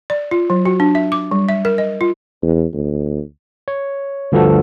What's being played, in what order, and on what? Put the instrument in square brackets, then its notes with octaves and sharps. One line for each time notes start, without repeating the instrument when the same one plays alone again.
[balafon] D5
F4
F#3
F#4
D4
E5
D6
G3
E5
A#4
D#5
F4
[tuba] E2
D2
[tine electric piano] C#5
D2 G2 D3 F3 F#4 A4